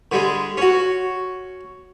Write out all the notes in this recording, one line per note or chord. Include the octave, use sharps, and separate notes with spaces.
D3 G3 G#3
C#4 F#4